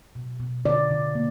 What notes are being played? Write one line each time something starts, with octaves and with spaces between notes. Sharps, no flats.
B2
B2
D3 D5
D3
A#3